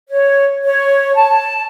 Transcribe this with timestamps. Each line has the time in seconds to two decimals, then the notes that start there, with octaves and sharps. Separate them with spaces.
0.08 C#5
0.65 C#5
1.16 A5